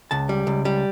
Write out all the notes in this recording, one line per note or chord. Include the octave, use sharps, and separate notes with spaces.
C#2 A5
G3
C#2
G3